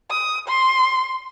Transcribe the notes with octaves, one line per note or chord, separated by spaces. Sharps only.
D#6
C6